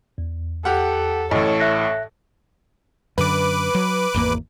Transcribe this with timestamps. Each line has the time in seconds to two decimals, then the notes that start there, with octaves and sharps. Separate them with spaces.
0.18 E2
0.65 G4 A4 F#5
1.31 A1 A2 A4 C#5 D#5
1.60 E5 F#6 A#6
3.18 F#2 D3 B4 D6
3.75 F#3
4.14 G#1 E2 A#3